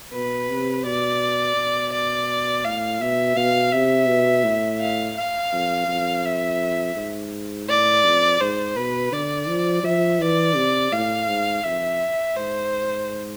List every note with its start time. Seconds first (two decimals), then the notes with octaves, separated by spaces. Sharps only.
0.13 B2 B4
0.49 C3
0.85 B2 D5
1.56 B2
1.93 D5
2.64 A2 F5
3.01 B2 E5
3.36 B2 F5
3.72 C3 E5
4.08 B2
4.44 A2
4.80 F5
5.17 F5
5.53 F2
5.88 F2
6.25 E5
6.96 G#2
7.68 A2 D5
8.05 F2
8.40 G#2 C5
8.76 B2 B4
9.12 D3 D5
9.49 F3
9.84 F3 E5
10.20 E3 D5
10.56 C3
10.92 A2 F5
11.28 G#2
11.64 F2 E5
12.36 G#2 C5